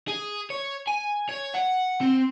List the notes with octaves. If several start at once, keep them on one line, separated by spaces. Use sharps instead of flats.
G#4
C#5
G#5
C#5
F#5
C4